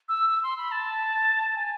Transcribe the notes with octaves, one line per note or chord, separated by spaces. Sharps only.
E6
E6
C6
B5
A5
G#5